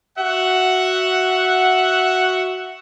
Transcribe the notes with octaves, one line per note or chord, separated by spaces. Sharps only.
F#4 E5 F#5